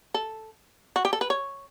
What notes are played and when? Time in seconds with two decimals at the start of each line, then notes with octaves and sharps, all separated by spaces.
0.14 A4
0.96 F#4
1.05 G4
1.13 A4
1.21 B4
1.30 C#5